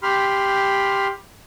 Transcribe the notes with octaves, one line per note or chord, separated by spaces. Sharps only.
G4 B5 C6 F6